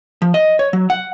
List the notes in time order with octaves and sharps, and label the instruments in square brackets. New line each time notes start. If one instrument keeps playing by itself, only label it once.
[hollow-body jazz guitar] F3
D#5
C#5
F#3
F#5